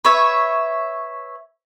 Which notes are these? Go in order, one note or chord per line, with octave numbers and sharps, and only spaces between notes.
B4 C#5 E5